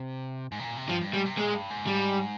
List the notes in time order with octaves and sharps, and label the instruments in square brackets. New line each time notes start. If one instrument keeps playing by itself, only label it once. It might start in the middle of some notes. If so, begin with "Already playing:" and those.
Already playing: [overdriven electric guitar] C3
G#2
C3
A#2
C3
[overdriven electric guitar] G2 [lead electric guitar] F3
[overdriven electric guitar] G2
[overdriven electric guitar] G#2 [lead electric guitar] G3
[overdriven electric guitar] C3
[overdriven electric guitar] A#2 [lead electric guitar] G#3
[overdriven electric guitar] G2
G#2
[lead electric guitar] G3